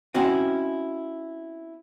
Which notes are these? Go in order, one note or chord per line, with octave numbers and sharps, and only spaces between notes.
C4 C#4 E4 F#4 D#5